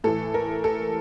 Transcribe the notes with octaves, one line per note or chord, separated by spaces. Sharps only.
A2 E3 A4
A#4
A4